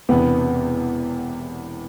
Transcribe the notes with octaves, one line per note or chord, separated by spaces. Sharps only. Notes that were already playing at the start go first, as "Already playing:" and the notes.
E1 E2 C3 B3